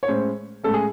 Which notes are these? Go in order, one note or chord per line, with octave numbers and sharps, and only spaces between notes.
C#5
A2 G#3 C#4 C5
A2 G#3 C#4 A4
G#4